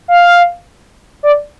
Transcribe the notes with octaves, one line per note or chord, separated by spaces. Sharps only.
F5
D5